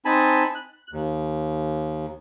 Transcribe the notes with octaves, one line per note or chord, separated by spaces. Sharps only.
C4 D#4 G#5 A5 B5
F#6
D#2